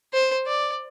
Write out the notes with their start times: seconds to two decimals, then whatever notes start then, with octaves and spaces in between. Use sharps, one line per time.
0.13 C5
0.47 D5